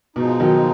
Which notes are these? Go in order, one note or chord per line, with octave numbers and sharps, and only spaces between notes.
B2 F3 G#3 D#4
D#3 F#3